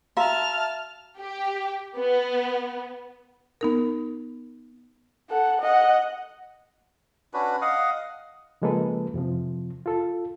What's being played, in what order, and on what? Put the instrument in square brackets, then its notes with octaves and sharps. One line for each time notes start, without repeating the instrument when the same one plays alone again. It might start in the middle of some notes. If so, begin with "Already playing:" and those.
[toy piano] F#4 F5 A#5 [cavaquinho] E5 [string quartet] A5 F6
[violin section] G4
B3
[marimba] B3 D#4 A#4
[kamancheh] A4 F#5
D#5 F#5
[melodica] C#4 D4 F#4 B4
D#5 F5 F#5 D#6
[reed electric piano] C#3 F3 G#3 A#3 A4 B4
F2 C3 F3
F4 A4